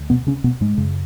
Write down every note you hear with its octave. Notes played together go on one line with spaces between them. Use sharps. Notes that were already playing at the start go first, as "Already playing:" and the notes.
Already playing: D2
B2 B3
C#3 C#4
B2 B3
G#2 G#3
F#2 C#3